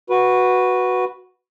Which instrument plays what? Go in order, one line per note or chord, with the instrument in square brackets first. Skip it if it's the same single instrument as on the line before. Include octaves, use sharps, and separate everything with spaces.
[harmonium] F#4 B4